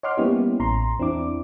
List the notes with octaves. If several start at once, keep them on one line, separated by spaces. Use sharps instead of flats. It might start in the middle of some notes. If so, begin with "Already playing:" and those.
C#5 D#5 F#5 C6 D6 F6
G3 A#3 B3 C#4 E4 G4
A1 A#5 C6
E2 C4 D4 E4 D6